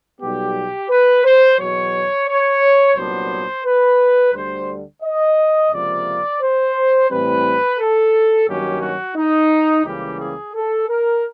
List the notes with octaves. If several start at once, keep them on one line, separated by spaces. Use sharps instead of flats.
B1 B2 G3 B3 G4
B4
C5
E2 B2 F#3 C#5
C#5
C2 A#2 F#3 B3 D4 C5
B4
D2 D3 G3 C5
D#5
C#2 C3 F3 A#3 D5
C5
A2 E3 G3 C4 B4
A4
G2 D#3 F#3 A#3 C#4 G4
F#4
D#4
C#2 C#3 E3 G3 A#3 G4
G#4
A4
A#4